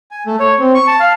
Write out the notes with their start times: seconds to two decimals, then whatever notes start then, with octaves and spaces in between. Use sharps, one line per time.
0.11 G#5
0.26 A3
0.40 C#5
0.59 C4
0.74 C#6
0.87 A5
1.00 F5